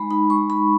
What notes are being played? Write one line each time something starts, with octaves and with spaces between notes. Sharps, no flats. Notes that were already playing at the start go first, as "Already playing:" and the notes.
Already playing: G#3 D#4 B5
D#4 B5
G#3 C#6
D#4 B5